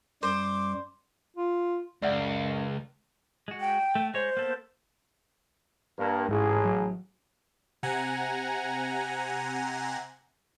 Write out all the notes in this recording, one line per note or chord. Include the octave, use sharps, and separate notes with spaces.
F#2 G3 C5 D6
F4
C#2 F#2 D5 E5 F#5
G#3 F#4
G5
A3
G#3 C5 C#5
A#3 B3 A4
G2 A#3
A1 G#2 G#4
F#3
C3 F#5 G#5 A#5